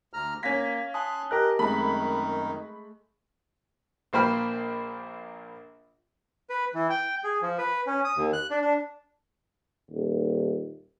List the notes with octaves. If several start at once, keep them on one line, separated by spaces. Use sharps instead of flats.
D2 A#5 F6
A#3 C#4 F5 G#6 A#6 B6
G#5 A5 C6 D#6 F#6
G4 A#4 D#5 F#6
F#2 D#3 G#3 A3 C4 D#4 B5
A#1 A#3 C5 G5 B5 F6
B4
E3
G5
G#4
F3
B4
C#4
D#6
D#2
F#6
D4
D4
D#1